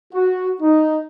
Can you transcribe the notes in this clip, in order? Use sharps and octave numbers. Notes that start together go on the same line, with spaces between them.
F#4
D#4